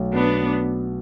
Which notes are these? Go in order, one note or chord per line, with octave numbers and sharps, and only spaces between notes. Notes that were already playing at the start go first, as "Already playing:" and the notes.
Already playing: B1 A3
B2 B3 D4